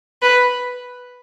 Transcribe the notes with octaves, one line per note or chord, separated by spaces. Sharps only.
B4